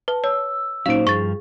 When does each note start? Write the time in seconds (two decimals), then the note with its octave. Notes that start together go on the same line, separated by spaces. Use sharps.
0.08 B4 A5
0.24 C#5 E6
0.86 A#2 F#3 C#4 D#4 C5 F5 D7
1.07 G2 F3 G#4 C#6 A6